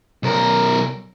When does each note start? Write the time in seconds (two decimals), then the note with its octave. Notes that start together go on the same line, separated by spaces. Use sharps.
0.23 B1 A#4